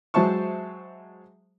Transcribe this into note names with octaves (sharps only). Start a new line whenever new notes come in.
F#3 G#3 C5 E5 A5 C#6